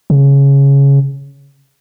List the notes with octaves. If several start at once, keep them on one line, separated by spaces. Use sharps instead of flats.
C#3